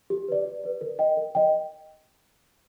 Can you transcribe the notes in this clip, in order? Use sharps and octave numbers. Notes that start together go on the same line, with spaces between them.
G4
B4 D5
G4
B4 D5
A#4
D#5 G5
A#4
D#5 G5